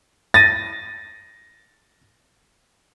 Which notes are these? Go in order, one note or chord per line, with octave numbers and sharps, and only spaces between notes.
A6 A#6 D#7